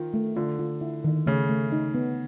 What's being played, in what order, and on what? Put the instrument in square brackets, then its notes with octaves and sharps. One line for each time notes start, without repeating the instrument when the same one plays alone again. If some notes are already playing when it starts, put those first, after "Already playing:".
Already playing: [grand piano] D#3 [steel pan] F4
[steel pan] A3
[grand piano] D3 [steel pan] F4
[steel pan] F4
E4
D#3
[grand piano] C#3 [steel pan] A3
[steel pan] A3
D#4
B3